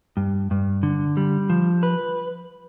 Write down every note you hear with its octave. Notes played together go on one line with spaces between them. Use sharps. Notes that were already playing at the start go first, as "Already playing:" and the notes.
G2
G2
D3
G3
F3
B4